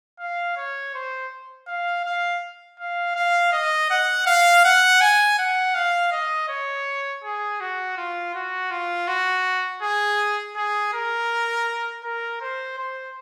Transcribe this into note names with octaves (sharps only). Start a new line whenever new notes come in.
F5
C#5
C5
F5
F5
F5
F5
D#5
F#5
F5
F#5
G#5
F#5
F5
D#5
C#5
G#4
F#4
F4
F#4
F4
F#4
G#4
G#4
A#4
A#4
C5
C5